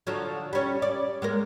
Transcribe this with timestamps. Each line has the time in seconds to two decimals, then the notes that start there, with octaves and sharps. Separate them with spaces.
0.07 D3 F3 F#3
0.53 G3 C#4
0.82 D5
1.22 G#3 A#3 A#4